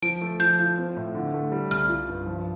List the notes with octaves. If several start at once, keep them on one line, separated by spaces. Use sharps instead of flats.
F3 D7
A3
F3 G6
F4
C4
A2
D3
A3
G3
C2 F6
F4
G2
F3